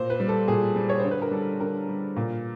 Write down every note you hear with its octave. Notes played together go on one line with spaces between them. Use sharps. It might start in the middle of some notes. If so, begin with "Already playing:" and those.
Already playing: A#2 C5
B4
G3
A4
A#2 G#4
G3
C#5
D3 C5
B4
A#4
G3 A4
D3 A#4
G3
A#2